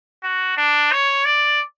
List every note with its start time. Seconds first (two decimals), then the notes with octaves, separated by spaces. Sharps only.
0.23 F#4
0.57 D4
0.92 C#5
1.25 D5